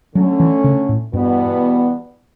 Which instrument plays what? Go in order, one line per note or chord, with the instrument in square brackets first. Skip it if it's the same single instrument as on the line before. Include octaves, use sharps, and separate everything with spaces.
[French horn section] D3 A3 C#4 [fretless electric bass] F#3
[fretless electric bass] E3
C#3
A2
[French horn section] E2 B2 G3 B3 [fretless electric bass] G2